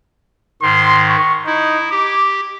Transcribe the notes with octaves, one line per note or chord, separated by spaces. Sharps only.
G#2 D#3 C6
C#6
D#4 E4
G4 D6